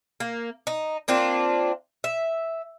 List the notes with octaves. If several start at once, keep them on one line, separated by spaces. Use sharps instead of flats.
A#3
D#4
A#3 C4 D4 F4
E5